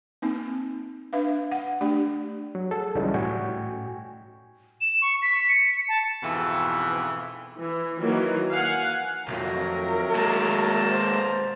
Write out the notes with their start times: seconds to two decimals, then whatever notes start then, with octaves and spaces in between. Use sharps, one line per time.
0.22 A#3 C4 D#4
1.13 D4 B4 E5 F5
1.51 F#5
1.81 A3 D4 G4 D5
2.55 F#3
2.71 G#4 A4
2.95 C#2 E3 F#3 G3 C#4 D#4
3.14 A2 F#4 G5 G#5 C#6
4.81 E7
5.02 C#6
5.22 B6
5.49 C#7
5.89 A5
6.23 F2 G#2 B2 E3
7.61 E3
8.00 D#3 E3 F#3 A#3 F#4
8.52 F5 F#5 G#5
9.28 B1 F2 D#3 F#3 A3 A#4
10.16 G#3 A#3 A5 A#5
10.90 B2 C5